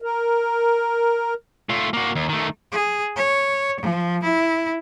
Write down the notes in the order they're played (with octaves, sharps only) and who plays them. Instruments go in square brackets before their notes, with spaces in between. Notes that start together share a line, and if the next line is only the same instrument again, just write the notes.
[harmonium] A#4
[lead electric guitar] A3 F4
A#3 F#4
D#2
D#3 A3
[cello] G#4
C#5
F3
E4